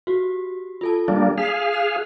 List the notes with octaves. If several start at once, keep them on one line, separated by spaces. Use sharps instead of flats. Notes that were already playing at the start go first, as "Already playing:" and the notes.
F#4 G4
F4 A4 A5
G3 A#3 D4
G#4 F5 B6 C7
F6 F#6